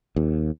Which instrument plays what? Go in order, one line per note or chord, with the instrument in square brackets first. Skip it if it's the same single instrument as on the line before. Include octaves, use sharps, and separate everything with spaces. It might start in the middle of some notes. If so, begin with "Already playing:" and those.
[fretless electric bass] D#2